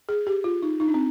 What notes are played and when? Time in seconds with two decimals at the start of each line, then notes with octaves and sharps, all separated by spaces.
0.09 G#4
0.27 G4
0.44 F4
0.62 D#4
0.80 D#4
0.88 D4
0.94 C4